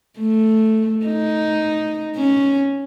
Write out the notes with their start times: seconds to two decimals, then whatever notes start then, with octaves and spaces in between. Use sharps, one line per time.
0.19 A3
1.05 D#4
2.16 C#4